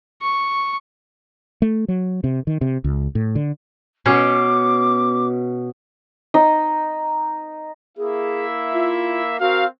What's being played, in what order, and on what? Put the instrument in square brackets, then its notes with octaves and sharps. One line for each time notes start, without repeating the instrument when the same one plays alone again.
[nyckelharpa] C#6
[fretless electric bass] A3
F#3
C3
D#3
C3
C#2
A2
D3
[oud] B2 [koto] C#4 [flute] D6
[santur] D#4
[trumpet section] A#3 E4 E5 [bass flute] G#4
[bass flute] F4
[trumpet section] C4 A#4 F5 [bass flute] F#4